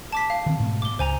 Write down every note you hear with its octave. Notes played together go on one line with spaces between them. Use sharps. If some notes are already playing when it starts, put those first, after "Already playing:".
A5 D6 B6
F5
D#3 E3 C4
G#2 B2 A3
D6 G7
C#2 C5 G#5 A#5